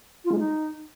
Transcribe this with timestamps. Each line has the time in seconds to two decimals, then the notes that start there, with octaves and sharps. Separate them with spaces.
0.25 F4
0.32 G#3
0.39 D#4